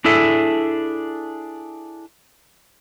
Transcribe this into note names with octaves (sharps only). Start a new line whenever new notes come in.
D4 E4 G#4 A4 E5